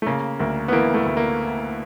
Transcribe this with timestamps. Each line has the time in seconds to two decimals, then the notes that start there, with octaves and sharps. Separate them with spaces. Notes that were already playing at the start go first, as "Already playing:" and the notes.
0.02 A3
0.07 C#3 A#3
0.39 D2 A#3
0.68 B3
0.72 E3 A#3
0.94 A3
1.06 D2
1.17 A#3